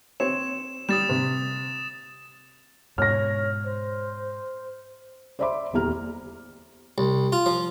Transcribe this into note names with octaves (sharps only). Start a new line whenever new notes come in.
C4 C#5 E7
G3 D#6 A6 E7
C3
G#2 B2 C#5 F6 A#6
C5
C5 D5 E5 B5 C6 D6
D#1 E2 G4 A#5 F6
C2
F4
F3